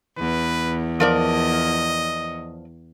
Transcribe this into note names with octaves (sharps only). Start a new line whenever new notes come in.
E2 B4
F3 A#4 D5 D#5